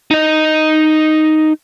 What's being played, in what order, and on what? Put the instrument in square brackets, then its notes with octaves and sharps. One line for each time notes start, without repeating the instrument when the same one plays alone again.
[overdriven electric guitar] D#4 D#5